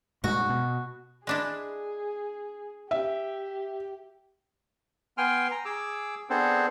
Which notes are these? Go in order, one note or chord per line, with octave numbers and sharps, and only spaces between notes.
G2 A#2 G#3 F#4
B2
G#3 D4 E4 G#4
G4 E5
B3 G5 G#5 C6 F6
A#5
G#4 D6 E6
B3 C4 D4 G#4 A4 C5